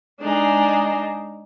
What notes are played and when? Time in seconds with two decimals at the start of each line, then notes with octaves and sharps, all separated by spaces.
0.20 G#3 D4 D#4 G#4